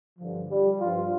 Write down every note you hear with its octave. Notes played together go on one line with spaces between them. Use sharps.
G2 D3 F3
G3
G2 F3 F4